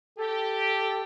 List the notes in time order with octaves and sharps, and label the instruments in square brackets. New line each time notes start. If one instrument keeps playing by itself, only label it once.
[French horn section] G4 [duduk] A4